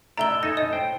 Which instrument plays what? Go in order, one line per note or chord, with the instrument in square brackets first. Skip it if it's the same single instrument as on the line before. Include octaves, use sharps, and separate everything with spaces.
[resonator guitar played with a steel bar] A2 E5 [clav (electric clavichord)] D5 [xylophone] A#5 G7
[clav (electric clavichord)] D#4 A4 G#5 [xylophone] A#6
[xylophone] D#5
[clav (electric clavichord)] C5 G5